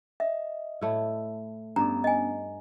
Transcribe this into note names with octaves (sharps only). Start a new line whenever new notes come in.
D#5 E5
A2 A3 E4
G2 B3 C#4 D4 D5 A#5
D#5 G#5